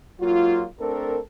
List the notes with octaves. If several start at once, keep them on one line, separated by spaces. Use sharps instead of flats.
G#2 F#3 A#3 F4
A3 C4 D4 A4 A#4